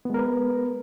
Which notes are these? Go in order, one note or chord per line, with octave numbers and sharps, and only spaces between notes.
G#3 B3 A#4 B4